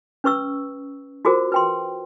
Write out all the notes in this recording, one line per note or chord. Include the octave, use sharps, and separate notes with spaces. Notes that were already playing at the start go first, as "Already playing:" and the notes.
C#4 B4 C#6 E6
F4 F#4 G#4 A#4 C5
B4 G5 C6